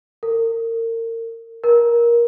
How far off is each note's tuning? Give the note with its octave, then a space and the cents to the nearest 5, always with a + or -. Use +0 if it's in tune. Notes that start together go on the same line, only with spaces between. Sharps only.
A#4 -35
A#4 +15